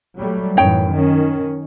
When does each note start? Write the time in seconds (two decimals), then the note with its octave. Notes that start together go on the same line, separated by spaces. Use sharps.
0.17 F#3 G3 A3
0.57 F#2 A2 E3 D#4 C#5 G5
0.92 D#3 C#4